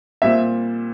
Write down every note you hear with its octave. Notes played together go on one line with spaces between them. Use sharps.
A#2 G3 C4 E5